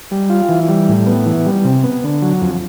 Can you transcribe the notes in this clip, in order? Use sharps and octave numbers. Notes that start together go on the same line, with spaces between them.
G3
F4
E3
G3
A2
B3
E3
G3
C3
B3
D3
F#3
F2